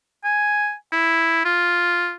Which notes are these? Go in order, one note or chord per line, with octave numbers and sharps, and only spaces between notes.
G#5
E4
F4